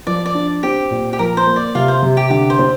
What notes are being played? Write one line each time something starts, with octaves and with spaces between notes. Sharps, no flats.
F3 D5
D5
D4
C4 G4
A#2
G4
F3 A#4
C5
A#3
D5
C3 F4 F5
C5
C3
G4
D3 G4
C5
C4